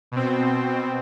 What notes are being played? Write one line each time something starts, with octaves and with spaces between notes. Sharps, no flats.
B2 C4